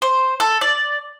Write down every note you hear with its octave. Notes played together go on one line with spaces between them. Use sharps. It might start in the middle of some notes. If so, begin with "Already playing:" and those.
C5
A4
D5